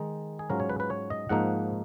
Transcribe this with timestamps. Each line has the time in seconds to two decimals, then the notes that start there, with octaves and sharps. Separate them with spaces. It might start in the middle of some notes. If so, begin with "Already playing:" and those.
Already playing: D#3 G#3 D#4
0.39 G#4
0.50 G#2 F#3 C#4 F4 A#4
0.60 C#5
0.70 B4
0.80 B4
0.90 C#5
1.10 D#5
1.29 G#2 F3 A#3 D#4 F#5